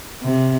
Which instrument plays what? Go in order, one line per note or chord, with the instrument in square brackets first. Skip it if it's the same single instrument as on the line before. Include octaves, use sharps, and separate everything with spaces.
[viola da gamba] C3